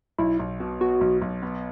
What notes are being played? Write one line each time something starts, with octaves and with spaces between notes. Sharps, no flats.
B1 E4
B1
B2
B3 F#4
B1
B1
B3